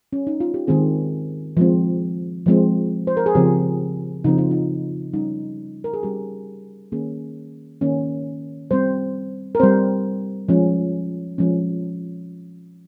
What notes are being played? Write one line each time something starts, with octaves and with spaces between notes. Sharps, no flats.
C#4
D#4
F4
G4
D#3 G#3 C4 G#4
F3 G#3 C4
F3 G#3 C4
C5
A#4
G#4
C#3 F3 C4 G4
C#3 F3 C4 D#4
F4
D#4
G3 C#4 D#4
A#4
G#4
G3 C#4 G4
D#3 A#3 C#4 G#4
D#3 A#3 C#4
G3 C4 C5
A#4
G3 C4 C5
F3 G#3 C#4
F3 G#3 C#4